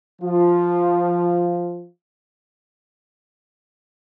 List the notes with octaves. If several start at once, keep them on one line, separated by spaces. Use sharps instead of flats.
F3 F4